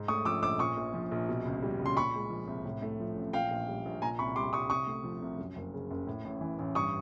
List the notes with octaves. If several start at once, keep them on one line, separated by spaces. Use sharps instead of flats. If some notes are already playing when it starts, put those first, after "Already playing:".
Already playing: G#2
A3 C#6 D#6
F3 D6 E6
A#1 D6 E6
A#2 C#6 D#6
A#1
F3
A#1
B2
C#2
G3
C#2
C6
A#2 B5 C#6
G#3
F3
C2
A2
A3
F3
A1
A#2 F5 G5
A#1
G3
A#1
A#2 G#5 A#5
C2 B5 C#6
G3 C6 D6
C2 C#6 D#6
C3 C#6 D#6
A3
F3
C2
F#2
F#1
C#3
F#1
A2
A1
E3
A1
G2 C#6 D#6